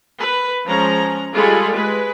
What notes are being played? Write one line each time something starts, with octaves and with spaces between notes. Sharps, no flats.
B4
F3 G#3 C#4 A#5
G3 G#3 F4 G#4 A4 B5
G#3 B4